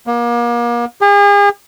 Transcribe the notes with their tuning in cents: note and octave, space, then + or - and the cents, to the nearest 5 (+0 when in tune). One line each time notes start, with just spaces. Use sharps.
A#3 +35
G#4 -40